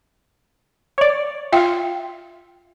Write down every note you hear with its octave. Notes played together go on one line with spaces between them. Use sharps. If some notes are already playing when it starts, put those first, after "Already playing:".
C#5 D5
F4 E5 F5 G5